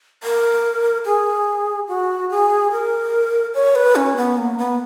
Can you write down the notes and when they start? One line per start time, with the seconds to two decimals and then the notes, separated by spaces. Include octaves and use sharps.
0.23 A#4
1.05 G#4
1.88 F#4
2.31 G#4
2.72 A#4
3.55 C#5
3.75 B4
3.96 C#4
4.17 B3
4.37 A#3
4.58 B3